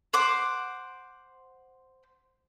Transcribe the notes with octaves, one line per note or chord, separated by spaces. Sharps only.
C5 F#5 D6